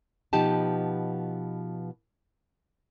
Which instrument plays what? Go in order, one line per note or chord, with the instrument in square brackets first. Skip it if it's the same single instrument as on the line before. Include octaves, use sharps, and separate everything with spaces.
[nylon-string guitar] B2 F3 B3 D#4 G4 A5